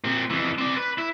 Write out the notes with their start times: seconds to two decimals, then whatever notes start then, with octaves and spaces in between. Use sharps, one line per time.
0.04 A#2 C4
0.30 F2 E3
0.59 C4 D5
0.76 B4
0.98 E4